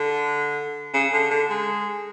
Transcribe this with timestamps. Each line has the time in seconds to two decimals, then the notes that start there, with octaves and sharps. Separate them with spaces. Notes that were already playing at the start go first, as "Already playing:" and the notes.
Already playing: D3
0.94 C#3
1.13 D3
1.31 D3
1.49 G#3